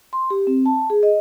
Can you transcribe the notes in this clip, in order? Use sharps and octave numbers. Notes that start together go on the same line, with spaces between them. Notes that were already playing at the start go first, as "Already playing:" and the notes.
C6
G4
C4
A5
G#4
D#5